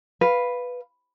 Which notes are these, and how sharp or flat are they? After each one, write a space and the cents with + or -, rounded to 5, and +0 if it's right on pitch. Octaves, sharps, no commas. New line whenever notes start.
B4 +0 F5 +0